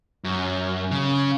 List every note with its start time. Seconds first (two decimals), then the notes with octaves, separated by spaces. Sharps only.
0.24 F#2
0.91 C#3